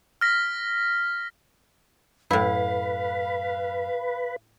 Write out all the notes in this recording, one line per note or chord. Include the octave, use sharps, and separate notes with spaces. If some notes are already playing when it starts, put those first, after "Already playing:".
F6 A#6 B6
F#2 A2 E4 B4 F5